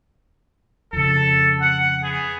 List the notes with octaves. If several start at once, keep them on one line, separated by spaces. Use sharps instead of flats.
F2 C#3 A4
F#5
B3 G#4